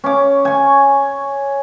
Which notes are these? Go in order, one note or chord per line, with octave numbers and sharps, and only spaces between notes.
C#4 D6
G#5 C#6